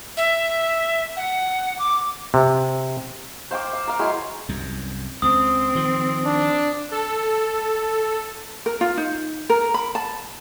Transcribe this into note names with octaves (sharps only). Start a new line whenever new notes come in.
E5
F#5
D6
C3
C5 F5 G5 D6
F5
A#4 F5
F#3 G#3 E4 C6
C2 F#2
C#2 C4 D#6
D#3 F3
D4
A4
A#4
F4
D#4
A#4
B5
A5